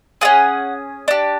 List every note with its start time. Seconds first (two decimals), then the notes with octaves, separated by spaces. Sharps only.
0.21 C#4 F4 G#4 F#5
1.08 D4 G4